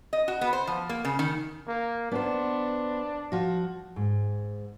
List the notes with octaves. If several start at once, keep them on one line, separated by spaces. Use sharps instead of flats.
D#5
F#4
B3
C5
F3
A#3
C#3
D#3
A#3
B3 D4 C5
F3 F#4
G#2